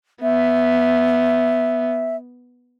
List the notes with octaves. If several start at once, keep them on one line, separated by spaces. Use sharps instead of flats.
B3 E5